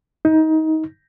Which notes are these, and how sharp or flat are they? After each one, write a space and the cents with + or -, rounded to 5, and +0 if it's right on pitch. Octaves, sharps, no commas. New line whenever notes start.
D#4 +20